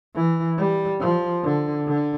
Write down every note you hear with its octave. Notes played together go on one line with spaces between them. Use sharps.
E3
G3
F3
D3
D3